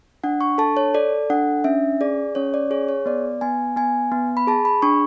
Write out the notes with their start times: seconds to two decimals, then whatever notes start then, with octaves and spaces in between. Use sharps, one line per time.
0.24 D4 F#5
0.41 C#6
0.58 A4 A5
0.77 C#5
0.94 A4 D5
1.30 D4 F#5
1.64 C#4 E5
2.01 G#4 D5
2.35 C#4 C#5
2.54 D5
2.71 G#4 C#5
2.89 C#5
3.06 B3 D5
3.41 B3 G#5
3.76 B3 G#5
4.12 B3
4.37 B5
4.47 G#4 A5
4.65 B5
4.82 D4 C#6